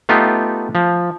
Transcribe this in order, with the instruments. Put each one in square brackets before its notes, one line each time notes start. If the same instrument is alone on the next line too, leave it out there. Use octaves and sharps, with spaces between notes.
[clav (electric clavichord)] A3 B3 D#4 F4 G4
F3